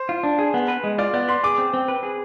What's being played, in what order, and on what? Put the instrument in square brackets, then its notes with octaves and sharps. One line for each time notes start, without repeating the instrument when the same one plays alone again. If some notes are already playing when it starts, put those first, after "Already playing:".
Already playing: [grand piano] C5
[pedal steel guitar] F4
D4
G#4
B3
B4
G#3
[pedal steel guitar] F4 [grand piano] D5
[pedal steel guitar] B3 [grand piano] D5
[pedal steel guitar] B4 [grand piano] C6
[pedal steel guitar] G#4 [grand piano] D6
[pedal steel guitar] C4
C4
B4
G#4